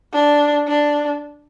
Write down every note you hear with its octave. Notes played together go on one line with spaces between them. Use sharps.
D4
D4